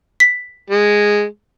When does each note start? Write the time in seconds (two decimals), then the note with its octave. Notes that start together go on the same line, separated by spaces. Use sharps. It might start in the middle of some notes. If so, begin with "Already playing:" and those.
0.20 B6
0.70 G#3